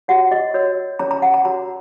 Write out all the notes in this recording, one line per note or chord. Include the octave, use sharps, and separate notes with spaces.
F#4 C#5 F#5
D#5
F#4 A#4 C#5
C#4 A#4 C#5 A#5
A#5
F#5
A#5
F#4 A#4 C#5 A#5